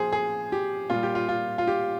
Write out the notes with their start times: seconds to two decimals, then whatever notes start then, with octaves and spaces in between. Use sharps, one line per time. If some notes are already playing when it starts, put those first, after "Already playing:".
Already playing: A#2 F3 G#4 C5
0.12 G#4
0.52 G4
0.90 A#2 G3 F4
1.03 G4
1.15 F4
1.29 F4
1.58 F4
1.67 G4